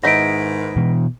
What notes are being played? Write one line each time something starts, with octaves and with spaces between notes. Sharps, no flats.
G#2 D#3 B3 D#4 E4 A#6 B6 D7
B2 E3